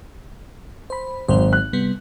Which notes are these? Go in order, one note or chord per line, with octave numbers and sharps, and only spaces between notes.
C5 B5
G#1 F#3 C5
F#6
C3 G3 B3